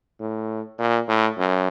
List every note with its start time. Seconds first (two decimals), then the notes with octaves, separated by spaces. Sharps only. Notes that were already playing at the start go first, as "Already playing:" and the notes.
0.20 A2
0.79 A#2
1.08 A2
1.38 F#2